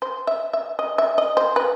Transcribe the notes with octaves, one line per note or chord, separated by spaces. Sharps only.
C5
E5
E5
D#5
E5
D#5
C5
B4